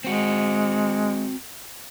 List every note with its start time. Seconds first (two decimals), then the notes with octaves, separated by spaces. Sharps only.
0.04 G#3 C4 F#4